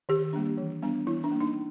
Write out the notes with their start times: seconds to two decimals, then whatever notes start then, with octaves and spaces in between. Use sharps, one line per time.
0.09 D#3 G4
0.33 G3 A#3 D4
0.58 E3
0.82 G3 B3 D4
1.07 E3 E4
1.24 D4
1.31 G3 A#3
1.40 D#4